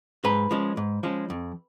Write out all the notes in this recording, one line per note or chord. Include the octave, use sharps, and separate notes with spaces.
G#2 B4
F3 G#3 C#4
G#2
F3 G#3 C#4
F2